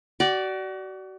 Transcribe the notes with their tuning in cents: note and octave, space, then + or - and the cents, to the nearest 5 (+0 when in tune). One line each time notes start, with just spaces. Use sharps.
F#4 +35 D5 +0